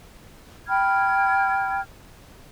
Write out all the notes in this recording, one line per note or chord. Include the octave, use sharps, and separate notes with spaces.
G5 B5 F6 G#6